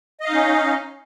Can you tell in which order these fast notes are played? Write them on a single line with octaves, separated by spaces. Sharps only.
D#5 F5 D#4 C#4